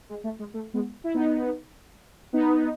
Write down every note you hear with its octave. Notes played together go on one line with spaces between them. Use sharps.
G#3
A3
G#3
A3
G#3 B3
E4
B3 D#4
B3 D#4